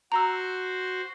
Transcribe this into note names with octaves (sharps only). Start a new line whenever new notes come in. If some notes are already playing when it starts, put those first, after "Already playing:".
F#4 C5 A#5 E6